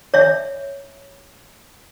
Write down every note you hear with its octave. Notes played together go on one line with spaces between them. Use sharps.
C#5 E5